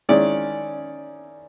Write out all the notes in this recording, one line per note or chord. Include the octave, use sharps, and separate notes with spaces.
D#3 G#3 C#4 E4 D5